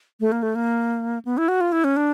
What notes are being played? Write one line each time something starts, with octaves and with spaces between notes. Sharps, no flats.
A3
A#3
A3
A#3
B3
E4
F#4
F4
E4
C#4
D4